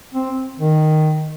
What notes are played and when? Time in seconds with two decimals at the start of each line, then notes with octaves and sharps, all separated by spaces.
0.13 C4
0.60 D#3